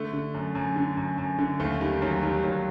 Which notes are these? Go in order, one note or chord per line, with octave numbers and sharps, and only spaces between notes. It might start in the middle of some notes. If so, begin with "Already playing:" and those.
Already playing: D3 A3
D3
F#2
F#2
D3
F#2
F#2
D3
D#2 A3
D#3 G3
D#2 F#3
D#3 G3
D#2 F#3